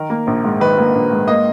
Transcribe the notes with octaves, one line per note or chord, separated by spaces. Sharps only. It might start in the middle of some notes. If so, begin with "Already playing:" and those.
Already playing: D#3 A#4
A#3
A#1
G#2
D#3 B4
A#3
A#1
G#2
A#3 D#5